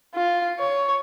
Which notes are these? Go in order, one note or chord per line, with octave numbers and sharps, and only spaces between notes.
F4
C#5